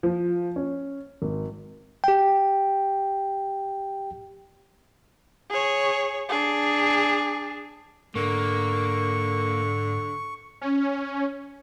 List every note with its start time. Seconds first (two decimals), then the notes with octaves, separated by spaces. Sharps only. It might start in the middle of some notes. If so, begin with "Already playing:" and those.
0.03 F3
0.56 C#4
1.22 G#1
2.04 G4 G5
5.50 G#4 C#5
6.29 D4 G#4
8.15 G#2 D3 A#3 C#6
10.61 C#4